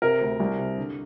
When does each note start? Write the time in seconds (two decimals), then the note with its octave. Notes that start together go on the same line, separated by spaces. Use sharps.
0.02 C3 A#4
0.21 D2
0.40 C2
0.59 C3
0.78 D3